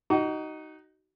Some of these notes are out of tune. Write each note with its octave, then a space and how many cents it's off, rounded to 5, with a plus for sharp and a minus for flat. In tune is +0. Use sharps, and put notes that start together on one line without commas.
D#4 +0 F#4 +35